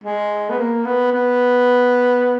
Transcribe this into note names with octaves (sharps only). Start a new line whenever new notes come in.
G#3
B3
A#3
B3
B3